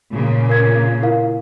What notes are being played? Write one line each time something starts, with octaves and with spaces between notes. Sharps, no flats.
A#2 C#3 A#3
A#4 G#6
E4 A#4 F5